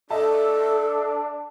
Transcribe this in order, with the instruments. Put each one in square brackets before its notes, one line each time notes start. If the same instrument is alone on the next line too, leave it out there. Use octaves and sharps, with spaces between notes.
[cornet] D4 [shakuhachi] A4 [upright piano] D#5 E5 A5